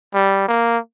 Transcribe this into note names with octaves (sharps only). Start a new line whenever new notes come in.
G3
A#3